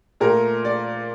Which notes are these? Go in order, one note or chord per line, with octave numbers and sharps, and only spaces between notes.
A#2 A3 A#4
D5